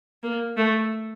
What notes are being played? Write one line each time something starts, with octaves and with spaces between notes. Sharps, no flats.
A#3
A3